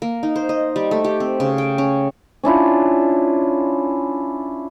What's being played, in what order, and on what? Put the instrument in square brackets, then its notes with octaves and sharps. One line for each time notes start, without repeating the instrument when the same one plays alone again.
[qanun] A#3
D#4
C5
D#5
G3
A3
G4
C4
C#3
G5
C#4
[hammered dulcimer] C#4 D4 E4 F4